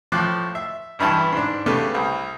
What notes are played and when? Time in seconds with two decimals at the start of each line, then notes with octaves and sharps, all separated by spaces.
0.12 A2 F3 D6 F#6
0.55 E5
0.99 C#2 G2 E3 A5
1.33 G#2 D4
1.66 C#3 A3 B3 G4
1.94 C2